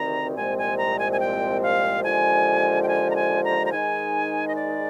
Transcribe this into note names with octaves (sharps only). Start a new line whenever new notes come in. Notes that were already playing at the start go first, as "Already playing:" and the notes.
Already playing: D2 C3 D#3 G3 C4 A#5
C2 A#2 F3 G#3 C4 G#5
G#5
A#5
G#5
G#5
G5
F5
D#2 D3 F3 G#3 G#5
G5
G#5
A#5
G#5
A#5
A#5
G#2 D#3 G#3 D#4 G#5
D#5
D5